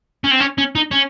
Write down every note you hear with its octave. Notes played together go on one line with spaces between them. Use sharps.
C#4
C4
C#4
C#4
D#4
C#4